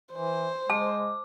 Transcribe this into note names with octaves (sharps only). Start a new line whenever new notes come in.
E3 C5
G#3 A5 D6